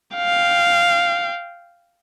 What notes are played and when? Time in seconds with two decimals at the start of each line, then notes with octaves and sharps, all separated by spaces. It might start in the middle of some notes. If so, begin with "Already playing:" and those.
0.16 F5 G5